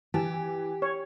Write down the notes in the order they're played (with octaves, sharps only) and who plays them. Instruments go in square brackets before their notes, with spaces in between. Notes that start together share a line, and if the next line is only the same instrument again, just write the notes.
[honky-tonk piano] E3 [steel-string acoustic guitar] G4 [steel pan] A5
[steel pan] C#5